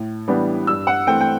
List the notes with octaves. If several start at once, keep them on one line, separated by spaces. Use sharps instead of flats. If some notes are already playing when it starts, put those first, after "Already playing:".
Already playing: A2
E3 G3 B3 D4
G2 E6
F#5
E3 A3 C4 G5
G5